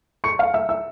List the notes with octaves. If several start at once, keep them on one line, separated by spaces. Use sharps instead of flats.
C#6 C#7
F5 F6
E5 E6
E5 E6